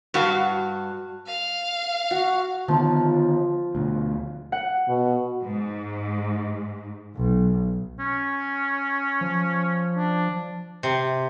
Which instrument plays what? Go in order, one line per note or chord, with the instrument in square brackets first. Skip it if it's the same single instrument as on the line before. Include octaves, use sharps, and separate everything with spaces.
[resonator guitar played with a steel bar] G2 F#4 F5
[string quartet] F5
[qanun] F#4
[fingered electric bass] D3 D#3 B3 [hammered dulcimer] F3
[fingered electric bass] D2 B2
[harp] F#5
[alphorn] B2
[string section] G#2
B1
[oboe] C#4
[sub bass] F3
[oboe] D4
[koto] C3